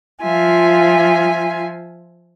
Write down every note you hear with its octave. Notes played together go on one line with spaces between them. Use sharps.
F3 F4 E5 G#5